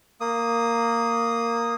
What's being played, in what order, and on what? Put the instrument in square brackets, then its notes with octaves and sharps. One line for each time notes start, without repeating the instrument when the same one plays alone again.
[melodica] A#3 D#6